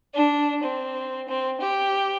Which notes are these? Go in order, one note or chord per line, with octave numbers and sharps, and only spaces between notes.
D4
C4
C4
G4